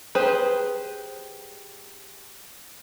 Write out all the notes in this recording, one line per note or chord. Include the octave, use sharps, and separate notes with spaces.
G4 G#4 B4 C5